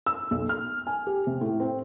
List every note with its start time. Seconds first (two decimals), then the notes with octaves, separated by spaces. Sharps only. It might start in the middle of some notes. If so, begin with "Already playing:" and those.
0.06 E6
0.31 B1
0.49 F6
0.87 G#5
1.07 G4
1.27 C3
1.41 A2
1.60 C4